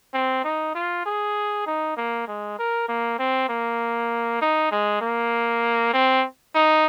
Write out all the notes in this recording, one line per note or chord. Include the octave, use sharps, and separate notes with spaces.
C4
D#4
F4
G#4
D#4
A#3
G#3
A#4
A#3
C4
A#3
D#4
G#3
A#3
C4
D#4